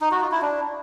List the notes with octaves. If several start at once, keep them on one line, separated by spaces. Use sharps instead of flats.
D#4
F#4
F4
E4
D4